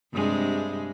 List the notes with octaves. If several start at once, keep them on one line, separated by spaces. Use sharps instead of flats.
G2 C3 G#3